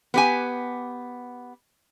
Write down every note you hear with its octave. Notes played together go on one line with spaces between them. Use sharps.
B3 G4 G#5